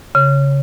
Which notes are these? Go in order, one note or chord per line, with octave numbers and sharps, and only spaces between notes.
C#3